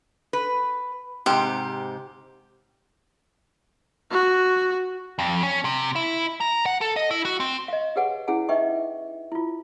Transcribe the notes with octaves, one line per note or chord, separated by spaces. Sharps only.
B4
G#2 C3 G4
F#4
F2
C#4
C3
E4
A#5
F#5
A4
D#5
E4
F#4
C4
D#5 F5
G4 G#4 B4 C#5 F#5 G#5
C#4 E4 G#4 F#5 G#5
D#4 B4 D#5 E5 G5 C#6
E4 F4